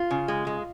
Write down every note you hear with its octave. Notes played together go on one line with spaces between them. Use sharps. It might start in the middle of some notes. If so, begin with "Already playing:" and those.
Already playing: F4
C#3
G#3
G#3